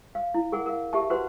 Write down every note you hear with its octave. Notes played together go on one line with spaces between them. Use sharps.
F5
E4
G#4 A#4 F#5
A#4 F5
G4 E5 A5
F#4 G4 B4 C5 F#5